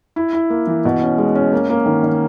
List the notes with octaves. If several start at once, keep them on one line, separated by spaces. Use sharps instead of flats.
E4
E4
A#3
E3
B2
C#4
G#3
C#4
A#3
A#3
D#3
D#3